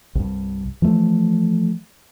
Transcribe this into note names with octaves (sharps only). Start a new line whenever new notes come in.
C2 G2
E3 F3 A3